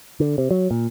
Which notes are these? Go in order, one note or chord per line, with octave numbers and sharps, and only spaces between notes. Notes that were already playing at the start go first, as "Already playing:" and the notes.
D3
C3
F#3
A#2